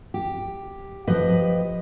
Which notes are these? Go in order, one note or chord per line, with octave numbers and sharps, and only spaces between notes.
G4
F3 G4 B4 D#5